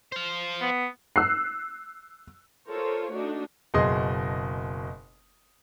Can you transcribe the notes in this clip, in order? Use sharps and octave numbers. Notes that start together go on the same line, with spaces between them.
C5 F5
B3
E6 F#6 C7
F4 A4 A#4 C5 C#5
A3 D4 D#4 F#4
F#1 B2 G#4 D#5 C6 D#6